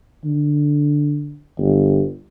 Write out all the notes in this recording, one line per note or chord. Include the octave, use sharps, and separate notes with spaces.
D3
G1